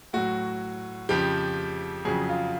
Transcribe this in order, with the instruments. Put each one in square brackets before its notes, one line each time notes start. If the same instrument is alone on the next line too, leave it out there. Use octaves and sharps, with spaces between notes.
[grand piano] A2 F#3 F#4
F2 C#3 F3 G4
F2 C#3 F#3 G#4
F4